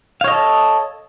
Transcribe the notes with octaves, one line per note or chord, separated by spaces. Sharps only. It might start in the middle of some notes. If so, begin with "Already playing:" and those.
A4 C#5 D#5 F5